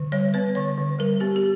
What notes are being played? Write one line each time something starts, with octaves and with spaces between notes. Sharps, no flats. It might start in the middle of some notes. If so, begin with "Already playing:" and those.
Already playing: D3
G3 C#5
B3 B4
D3 C#5
D3
G3 A#4
B3 G4
G4